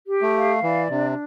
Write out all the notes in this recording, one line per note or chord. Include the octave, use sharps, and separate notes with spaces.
G4
A3
F5
E3 D5
C3 D4